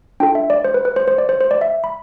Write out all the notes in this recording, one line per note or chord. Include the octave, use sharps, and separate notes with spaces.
D4 F4 A4 G5
E5
D5
C5
B4
B4
C5
C5
D5
C5
C5
D5
E5
B5